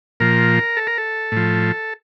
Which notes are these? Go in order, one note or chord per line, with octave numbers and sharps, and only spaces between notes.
A#2 F3 A#4
A4
A#4
A4
A2 F3